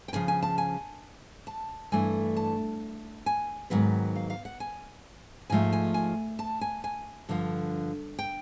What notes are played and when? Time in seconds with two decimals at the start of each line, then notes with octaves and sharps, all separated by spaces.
0.08 G5
0.13 F#2 C#3 F3 G#5
0.28 G#5
0.43 A5
0.58 G#5
1.47 A5
1.92 G2 E3 A3 G#5
2.36 A5
3.26 G#5
3.70 G#2 D#3 F#3 B3 F#5
4.15 F5
4.30 F5
4.45 F#5
4.60 G#5
5.50 G#2 F3 A3 G#5
5.73 G#5
5.94 G#5
6.39 A5
6.61 G#5
6.84 G#5
7.29 G2 D3 F3
8.19 G5